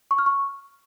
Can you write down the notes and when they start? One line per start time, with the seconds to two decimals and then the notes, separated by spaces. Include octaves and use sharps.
0.11 C#6
0.18 F6
0.26 C#6